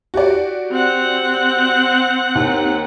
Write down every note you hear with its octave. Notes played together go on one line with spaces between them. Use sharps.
F#4 G4 D5
C4 F#5
D#2